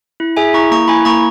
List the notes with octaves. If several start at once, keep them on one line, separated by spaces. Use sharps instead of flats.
E4
G#4 E5 G#5
E4 A#5 C#6
A#3 A#5 C#6
E4 G#5 B5
A#3 A#5 C#6